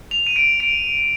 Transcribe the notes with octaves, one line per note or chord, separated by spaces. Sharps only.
F7
D#7
D7
D7